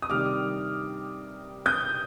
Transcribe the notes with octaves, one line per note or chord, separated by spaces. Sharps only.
D#6
C3 D#3 G3 D6 F6
D#6 G6